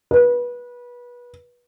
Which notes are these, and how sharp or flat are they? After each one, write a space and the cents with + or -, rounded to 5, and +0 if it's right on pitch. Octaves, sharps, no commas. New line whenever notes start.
B4 -25